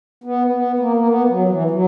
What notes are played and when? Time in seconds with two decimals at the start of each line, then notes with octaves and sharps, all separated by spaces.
0.24 B3
0.52 B3
0.79 A#3
0.96 A#3
1.08 B3
1.28 F#3
1.49 E3
1.71 F#3